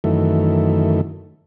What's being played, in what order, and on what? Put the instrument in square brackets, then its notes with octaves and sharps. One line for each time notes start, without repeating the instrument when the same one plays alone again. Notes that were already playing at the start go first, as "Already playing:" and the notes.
[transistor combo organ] F#2 D#3 E3 A3